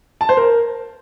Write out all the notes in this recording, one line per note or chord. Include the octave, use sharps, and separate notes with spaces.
A5
C5
A#4